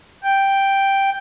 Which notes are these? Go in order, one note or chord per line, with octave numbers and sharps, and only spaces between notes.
G5